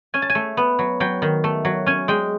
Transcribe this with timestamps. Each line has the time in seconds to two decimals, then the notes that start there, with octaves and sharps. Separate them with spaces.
0.14 C#4 G#5
0.22 A5
0.30 G#5
0.35 A3
0.57 B3
0.79 F#3
1.00 F#3 G5
1.22 D#3
1.44 A3
1.65 F#3
1.86 C#4 G#5
2.08 G#3 G5